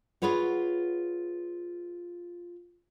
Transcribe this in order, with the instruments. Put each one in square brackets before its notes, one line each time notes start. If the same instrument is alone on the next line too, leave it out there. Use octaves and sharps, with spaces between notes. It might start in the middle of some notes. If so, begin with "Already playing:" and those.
[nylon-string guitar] F4 G#4 B4 C#5 F#5